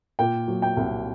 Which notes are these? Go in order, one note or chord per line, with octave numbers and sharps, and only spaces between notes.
A#2 G5
F#3
G5
C2